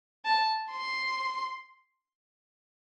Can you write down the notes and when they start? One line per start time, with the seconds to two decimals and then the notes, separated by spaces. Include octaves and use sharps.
0.25 A5
0.71 C6